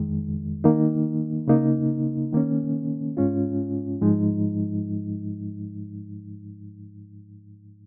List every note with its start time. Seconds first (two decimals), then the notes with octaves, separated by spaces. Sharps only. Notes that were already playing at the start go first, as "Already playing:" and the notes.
Already playing: F2 D#3 G#3
0.64 D#3 A#3 D#4
1.48 C#3 A#3 D#4
2.33 D#3 A#3 C#4
3.17 G#2 G#3 C#4 F4
4.01 G#2 F3 G#3 D#4